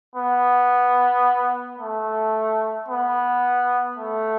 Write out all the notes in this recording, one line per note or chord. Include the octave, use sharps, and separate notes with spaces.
B3
A3
B3
A3